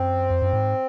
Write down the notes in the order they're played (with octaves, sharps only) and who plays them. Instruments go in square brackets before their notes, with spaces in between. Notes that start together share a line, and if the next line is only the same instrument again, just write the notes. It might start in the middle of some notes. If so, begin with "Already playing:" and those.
Already playing: [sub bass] F#2 [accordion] C4
[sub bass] F2
F#2
G#2